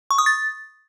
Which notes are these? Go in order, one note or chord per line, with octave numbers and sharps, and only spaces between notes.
C#6
D#6
A6